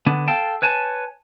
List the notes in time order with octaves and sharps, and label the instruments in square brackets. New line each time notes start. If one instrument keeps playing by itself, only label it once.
[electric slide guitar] D3 B3 D4
A4 F5 G5 A5
B4 C#5 G#5 A5